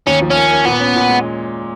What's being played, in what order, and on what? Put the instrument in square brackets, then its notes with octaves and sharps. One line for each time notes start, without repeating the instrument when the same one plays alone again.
[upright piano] D#2 [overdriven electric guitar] C#4
[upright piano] F3
[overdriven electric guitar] C#4
[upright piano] A#3
A#3
[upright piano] A#2 [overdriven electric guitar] B3
[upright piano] C#4
A#2
G#3